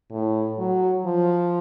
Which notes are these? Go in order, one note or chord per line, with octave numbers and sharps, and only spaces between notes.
A2
F#3
F3